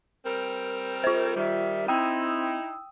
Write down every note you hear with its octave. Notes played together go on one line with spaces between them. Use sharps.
G3 C4 A#4
F4 C5
D#3 G3 E5
C4 D#4 E4 G5 D#6 E6